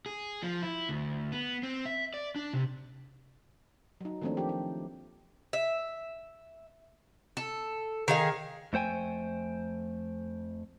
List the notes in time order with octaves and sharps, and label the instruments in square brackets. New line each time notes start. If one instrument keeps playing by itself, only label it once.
[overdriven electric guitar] G#4
F3
E4
D2
B3
C4
E5
D5
D4
C3
[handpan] F#3 D#4
D#3 F3 A3 A#3 C4 D4
F3 G4
G4
[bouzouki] E5
A4
D#3 G#4 F5
[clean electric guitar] F2 A3 C5 G5 G#5